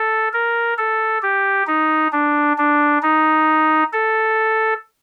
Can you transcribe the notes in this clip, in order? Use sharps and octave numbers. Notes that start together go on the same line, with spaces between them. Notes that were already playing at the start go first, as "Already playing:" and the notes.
Already playing: A4
A#4
A4
G4
D#4
D4
D4
D#4
A4